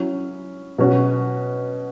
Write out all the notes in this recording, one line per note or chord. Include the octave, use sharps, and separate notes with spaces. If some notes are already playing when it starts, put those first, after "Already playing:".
Already playing: F#3 C#4 E4
B2 F#3 C#4 F#4